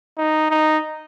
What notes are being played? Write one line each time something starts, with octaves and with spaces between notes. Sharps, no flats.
D#4
D#4